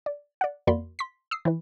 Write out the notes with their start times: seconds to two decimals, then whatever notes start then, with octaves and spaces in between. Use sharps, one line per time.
0.06 D5
0.41 D5 F#5
0.67 F2 A#3 F#4 D5 B5 C6
0.99 C6 B6
1.31 D#6 E6 C7
1.45 E3 E4 B4